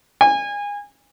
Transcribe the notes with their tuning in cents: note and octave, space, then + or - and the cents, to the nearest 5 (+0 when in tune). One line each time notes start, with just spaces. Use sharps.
G#5 -25